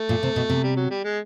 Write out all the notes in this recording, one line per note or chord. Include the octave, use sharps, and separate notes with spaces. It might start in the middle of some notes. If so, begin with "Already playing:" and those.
Already playing: A3
A#2
C3
B2
C3
G3
F#3
G3
G#3